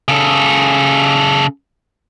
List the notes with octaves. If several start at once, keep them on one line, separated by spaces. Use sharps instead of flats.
C#3 A4